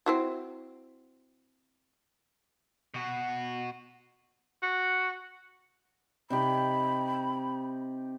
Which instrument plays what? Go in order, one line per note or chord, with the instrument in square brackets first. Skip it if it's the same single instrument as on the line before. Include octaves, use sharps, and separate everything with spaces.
[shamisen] C4 E4 F#4
[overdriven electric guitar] B2 F#4
[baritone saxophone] F#4
[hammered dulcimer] C3 D#4 G4 [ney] B5